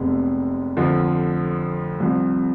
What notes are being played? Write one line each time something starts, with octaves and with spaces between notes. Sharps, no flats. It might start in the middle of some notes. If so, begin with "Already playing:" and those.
Already playing: F1 F2 C3 G#3 B3
F2 D3 F3
C2 C3 F3